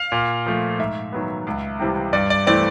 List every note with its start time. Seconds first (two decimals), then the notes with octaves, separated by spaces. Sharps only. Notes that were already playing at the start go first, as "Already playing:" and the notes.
Already playing: F5
0.12 A#2
0.46 F3 A3
0.79 G#2 E5
1.12 D#3 F#3 B3
1.47 C#2
1.79 C3 E3 G3 C4
2.13 G2 D5
2.30 D5
2.47 E3 A3 C4 D5